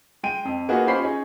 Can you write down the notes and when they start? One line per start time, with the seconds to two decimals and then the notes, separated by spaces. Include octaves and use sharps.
0.23 G#3 G5 D#7
0.45 F2
0.69 A#3 B3 D#4 F4 F#4 G#4
0.87 C#4 F4 G4 C5 B5 C7
1.02 C#4 D#4 G#4